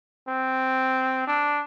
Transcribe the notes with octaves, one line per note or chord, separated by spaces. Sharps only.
C4
D4